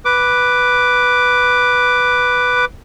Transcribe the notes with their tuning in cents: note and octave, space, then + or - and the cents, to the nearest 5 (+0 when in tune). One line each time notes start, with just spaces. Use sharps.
B4 +0 D6 +0